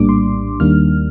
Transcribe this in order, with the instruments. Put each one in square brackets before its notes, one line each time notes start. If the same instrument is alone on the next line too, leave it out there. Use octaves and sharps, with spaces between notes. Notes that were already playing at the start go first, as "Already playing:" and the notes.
Already playing: [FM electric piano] A#1 A2 G3 A#3 D4 D6
C6
D#2 D#3 G3 A#3 D4 F6